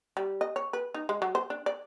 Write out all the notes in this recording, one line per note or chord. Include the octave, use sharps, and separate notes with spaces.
G3
D#5
C#5
B4
D#4
G#3
F#3
C5
D4
D5